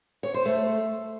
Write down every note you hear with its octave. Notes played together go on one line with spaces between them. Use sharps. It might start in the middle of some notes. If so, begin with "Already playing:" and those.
C#5
C5
A3